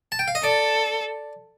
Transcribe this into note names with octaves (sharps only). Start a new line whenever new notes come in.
A5
G5
F5
D#5
A4 D5